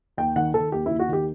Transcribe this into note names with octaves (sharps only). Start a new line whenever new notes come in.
D#2 G5
D#3 F#5
D#3 A4
D#2 G4
E4
D#2
F#4
D#3 G4